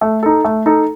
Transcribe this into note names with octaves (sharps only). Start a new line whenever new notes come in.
A3
D#4 A4
A3
D#4 A4